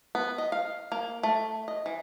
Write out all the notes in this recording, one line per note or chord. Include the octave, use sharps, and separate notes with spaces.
B3
D#5
F5
A#3
A3
D#5
E3